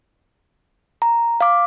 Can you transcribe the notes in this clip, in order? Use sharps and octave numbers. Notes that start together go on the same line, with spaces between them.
A#5
F5 D6